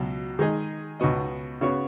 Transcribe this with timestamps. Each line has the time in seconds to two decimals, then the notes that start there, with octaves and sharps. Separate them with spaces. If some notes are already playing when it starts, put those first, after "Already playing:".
Already playing: C#2 B2 F#3
0.39 D#3 G#3 D#4 G#4 D#5
1.00 C#2 B2 B3 F#4 D#5
1.61 C#3 B3 F#4 C#5